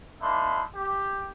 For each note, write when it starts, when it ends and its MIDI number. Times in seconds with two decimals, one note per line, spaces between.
0.22 0.64 58
0.22 0.64 62
0.22 0.64 63
0.22 0.64 76
0.22 0.64 83
0.22 0.64 84
0.75 1.31 67